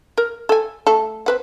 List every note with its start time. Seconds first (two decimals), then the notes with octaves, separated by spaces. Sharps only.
0.18 A#4
0.49 A4 G#5
0.87 A3 A4
1.26 C4 B4 F#5